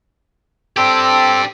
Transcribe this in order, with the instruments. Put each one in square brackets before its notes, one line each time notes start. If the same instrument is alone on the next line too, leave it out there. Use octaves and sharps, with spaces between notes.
[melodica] C4 A4 [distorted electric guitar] D4 G4